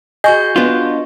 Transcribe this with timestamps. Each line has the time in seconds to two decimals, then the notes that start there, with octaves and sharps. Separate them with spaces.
0.24 F#4 G#4 D#5 C#6 G6
0.56 B3 D4 F4